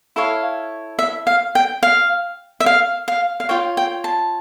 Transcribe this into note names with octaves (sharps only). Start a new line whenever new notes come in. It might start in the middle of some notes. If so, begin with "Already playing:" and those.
E4 A4 C#5 F5
E5
F5
G5
F5
E5
F5
F5
F5
F4 C#5 G5
G5
A5